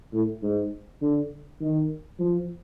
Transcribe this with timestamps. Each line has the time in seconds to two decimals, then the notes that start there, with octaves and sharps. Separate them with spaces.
0.13 A2
0.43 G#2
1.02 D3
1.61 D#3
2.19 F3